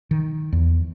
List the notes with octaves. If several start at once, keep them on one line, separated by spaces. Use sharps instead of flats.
D#3
E2